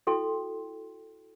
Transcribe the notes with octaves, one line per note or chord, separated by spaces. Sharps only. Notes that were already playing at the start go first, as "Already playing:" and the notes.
E4 F#4 A4 G5 C6